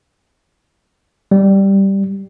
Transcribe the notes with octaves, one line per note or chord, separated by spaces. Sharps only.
G3